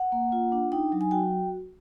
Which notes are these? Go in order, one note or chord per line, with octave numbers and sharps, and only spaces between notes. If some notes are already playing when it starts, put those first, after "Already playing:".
Already playing: F#5
A#3
F4
D4
D#4 G5
F#3
G#5
F#4 G5